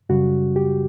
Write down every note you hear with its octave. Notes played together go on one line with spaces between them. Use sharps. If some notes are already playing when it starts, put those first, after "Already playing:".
F#2 C#3 G3 F#4
G4